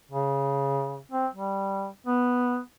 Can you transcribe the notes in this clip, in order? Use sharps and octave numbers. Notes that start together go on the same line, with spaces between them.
C#3
C4
G3
B3